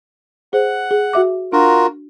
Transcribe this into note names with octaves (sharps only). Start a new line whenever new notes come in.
G#4 C5 F#5
G#4
F#4 E5 D6
D4 F4 F#4 A#4